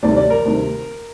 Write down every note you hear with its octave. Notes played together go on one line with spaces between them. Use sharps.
D2 C3 D#3 G3 D5
D5
A#4
D2 C3 D#3 G3